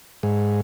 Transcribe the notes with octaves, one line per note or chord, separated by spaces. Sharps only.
G#2